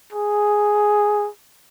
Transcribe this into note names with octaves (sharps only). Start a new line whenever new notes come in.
G#4